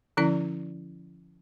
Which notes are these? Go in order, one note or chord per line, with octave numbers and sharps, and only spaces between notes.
D3 F3 C#4 E4 D5